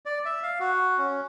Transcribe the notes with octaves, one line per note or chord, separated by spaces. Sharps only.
D5
E5
F5
F#4
C#4